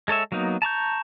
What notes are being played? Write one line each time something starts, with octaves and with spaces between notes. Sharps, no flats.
G#3 A4 C#5 E5
F#3 A#3 B3 D#4
A5 A#5 C#6 G6